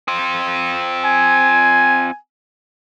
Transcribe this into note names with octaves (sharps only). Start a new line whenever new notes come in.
C4 F4
G#5